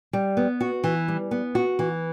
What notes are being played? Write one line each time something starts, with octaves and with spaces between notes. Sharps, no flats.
G3
B3
F#4
E3
G3
B3
F#4
E3